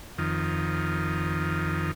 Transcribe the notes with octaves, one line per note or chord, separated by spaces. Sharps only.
F2 D#3